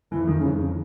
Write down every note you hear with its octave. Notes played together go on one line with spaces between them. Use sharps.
F2 E3
D#3
F2 C#3